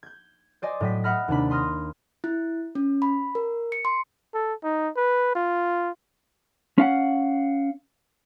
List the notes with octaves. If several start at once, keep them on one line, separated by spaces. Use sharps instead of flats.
G6 G#6
C5 D5 D#5 G#5
A2 F#3 D#5 G5 B6
E5 F#5 B5 D#6 F6 A#6
D#2 C3 D4 B5
B5 C6 D#6 F6 A#6
E4
C#4
B5
A#4
C#7
C6
A4
D#4
B4
F4
C#4 F5 F#5